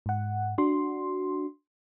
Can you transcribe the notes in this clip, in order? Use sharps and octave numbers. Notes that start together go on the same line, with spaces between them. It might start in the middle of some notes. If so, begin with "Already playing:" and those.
G#2 F#5
D4 F#4 C6